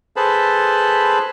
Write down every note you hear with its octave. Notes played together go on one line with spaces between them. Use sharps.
G#4 A4 B4 C5 A5 B5